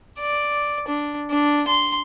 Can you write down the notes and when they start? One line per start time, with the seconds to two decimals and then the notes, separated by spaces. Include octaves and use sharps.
0.19 D5
0.88 D4
1.31 D4
1.67 C6